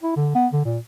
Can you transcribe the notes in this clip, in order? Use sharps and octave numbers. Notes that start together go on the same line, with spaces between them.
E4
D3
B3
D3
A#2